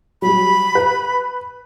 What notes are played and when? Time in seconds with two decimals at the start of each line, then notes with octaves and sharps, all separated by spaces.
0.22 F#3 G3 B5
0.75 B4